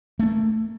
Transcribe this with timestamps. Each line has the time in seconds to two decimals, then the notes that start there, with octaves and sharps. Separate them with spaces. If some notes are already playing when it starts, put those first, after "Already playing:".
0.19 A3
0.23 C#4
0.26 A#3